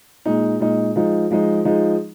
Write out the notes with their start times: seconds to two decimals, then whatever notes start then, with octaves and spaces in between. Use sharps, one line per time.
0.25 A#2 G#3 D#4
0.60 A#2 G#3 D#4
0.96 F3 G#3 D#4
1.31 F3 G#3 D#4
1.65 F3 G#3 D#4